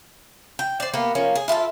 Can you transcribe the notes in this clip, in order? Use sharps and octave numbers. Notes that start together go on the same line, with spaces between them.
G5
C5 D5
A#3 B3 G4 B4
F3 A#3 C#4
G#4
E4 F4 G#4 A4